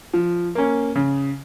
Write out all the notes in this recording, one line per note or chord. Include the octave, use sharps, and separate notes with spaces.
F3
A#3 C#4
C#3